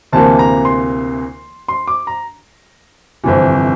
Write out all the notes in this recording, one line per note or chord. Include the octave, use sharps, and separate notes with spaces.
D2 C3 E3 A#3 A5
A#5
C6
C6
D6
A#5
G1 F2 C3 E3